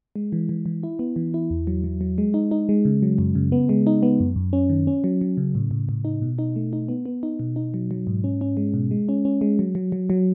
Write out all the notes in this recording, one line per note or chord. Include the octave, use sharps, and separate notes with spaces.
G#3
E3
E3
E3
E4
B3
E3
E4
E2
F#3
F#3
F#3
G#3
D#4
D#4
G#3
C#3
F#3
F#2
C#3
B3
G#3
D#4
B3
F#2
F#2
C#4
D#3
C#4
F#3
F#3
C#3
A2
A2
A2
D#4
B2
D#4
A3
D#4
B3
B3
D#4
B2
D#4
F#3
F#3
G#2
C#4
C#4
G#3
B2
G#3
C#4
C#4
G#3
F#3
F#3
F#3
F#3